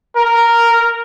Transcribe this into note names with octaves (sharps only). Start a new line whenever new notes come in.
A#4